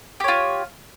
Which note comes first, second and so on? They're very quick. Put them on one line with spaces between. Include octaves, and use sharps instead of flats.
G4 C#5 F4